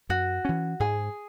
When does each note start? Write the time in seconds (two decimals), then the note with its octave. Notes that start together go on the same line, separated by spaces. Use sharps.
0.09 F#2 F#4
0.45 E3 C#4
0.80 G#2 G#4